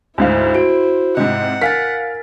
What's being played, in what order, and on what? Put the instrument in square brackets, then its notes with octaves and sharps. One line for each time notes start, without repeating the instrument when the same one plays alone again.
[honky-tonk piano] D2 G#2 F5 [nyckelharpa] E4 C5
[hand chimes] F#4 [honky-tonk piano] D7
[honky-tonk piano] G#2 C3 [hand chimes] D#5 [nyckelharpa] F#5
[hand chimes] A#4 G#5 A6 [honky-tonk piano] F5 F6 B6